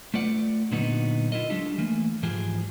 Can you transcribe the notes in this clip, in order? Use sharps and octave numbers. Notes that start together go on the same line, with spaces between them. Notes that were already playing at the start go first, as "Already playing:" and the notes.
A3 F4 B4 D5 F#5
A#2 D3 F#3 B3 D#4 F#4
E4 F4 A#4 D#5
F#3 G#3 D4 F4 G4 A4
E3 A3 A#3
G#2 E3 F3 G4 G#4